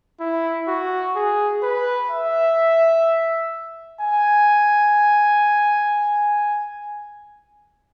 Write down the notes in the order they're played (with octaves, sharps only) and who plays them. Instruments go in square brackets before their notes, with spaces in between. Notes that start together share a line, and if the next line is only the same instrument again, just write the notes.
[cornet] E4
F#4
G#4
B4
E5
G#5